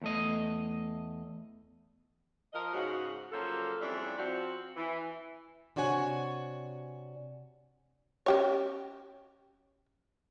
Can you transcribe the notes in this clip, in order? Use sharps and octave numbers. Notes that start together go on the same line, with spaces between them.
E2 A3 D#5
F3 A#4 D#5
G#2 C#3 F#4
C#3 F3 F#3 A#3 A4
F2 C#3 G3 D4 E4 E5
F3 C4 F#4
E3
C3 D4 F#4 C#5 G#5
C#4 G4 C#5